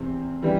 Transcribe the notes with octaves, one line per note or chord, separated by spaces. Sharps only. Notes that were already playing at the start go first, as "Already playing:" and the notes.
Already playing: E2 C3 C4
E3 G3